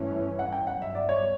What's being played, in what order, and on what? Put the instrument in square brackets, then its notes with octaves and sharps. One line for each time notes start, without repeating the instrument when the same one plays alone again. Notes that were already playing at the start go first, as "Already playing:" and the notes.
Already playing: [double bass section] G2 E3 A3 C#4
[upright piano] F#5
G5
[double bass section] G2 F#3 B3 [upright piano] F#5
[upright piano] E5
D5
C#5